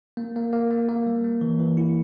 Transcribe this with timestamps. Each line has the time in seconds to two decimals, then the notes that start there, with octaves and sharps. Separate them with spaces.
0.17 A#3
0.36 A#3
0.53 A#3
0.71 A#3
0.89 A#3
1.07 G3
1.24 A#3
1.41 E3
1.59 E3
1.77 E4